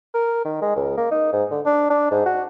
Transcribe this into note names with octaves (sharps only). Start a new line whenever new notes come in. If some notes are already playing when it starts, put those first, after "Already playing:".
A#4
D#3
G#3
C#2
A#3
D#4
G#2
D3
D4
D4
G#2
F#4